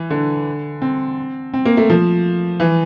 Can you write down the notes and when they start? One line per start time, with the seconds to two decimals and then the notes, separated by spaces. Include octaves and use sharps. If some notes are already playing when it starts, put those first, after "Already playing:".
Already playing: E3
0.10 D3
0.82 C4
1.54 C4
1.66 A#3
1.77 A3
1.90 F3
2.60 E3